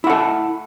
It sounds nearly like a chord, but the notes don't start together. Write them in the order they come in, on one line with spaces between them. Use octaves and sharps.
E4 F#5 A4